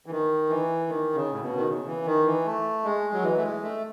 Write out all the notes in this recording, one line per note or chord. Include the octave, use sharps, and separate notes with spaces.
E3
D#3
E3
D#3
C#3
A2
B2
D#3
C#3
E3
D#3
E3
A3
G#3
F#3
E3
A3
G#3
A3